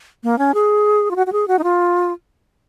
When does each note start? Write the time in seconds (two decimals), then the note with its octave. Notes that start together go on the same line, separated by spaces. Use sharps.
0.23 A#3
0.38 C#4
0.54 G#4
1.11 F4
1.16 F#4
1.27 F#4
1.32 G#4
1.48 F#4
1.59 D#4
1.64 F4